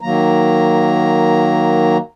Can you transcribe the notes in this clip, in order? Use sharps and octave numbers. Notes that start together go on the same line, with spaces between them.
D#3 F#3 A#3 A#5